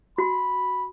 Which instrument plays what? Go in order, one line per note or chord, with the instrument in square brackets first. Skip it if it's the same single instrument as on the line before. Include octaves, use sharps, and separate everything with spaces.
[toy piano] F#4 [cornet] B5